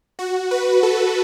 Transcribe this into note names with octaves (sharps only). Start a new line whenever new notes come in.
F#4
B4
A4